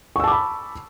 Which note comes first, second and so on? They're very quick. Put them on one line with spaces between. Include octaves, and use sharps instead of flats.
C#6 E6 A5 D6 B5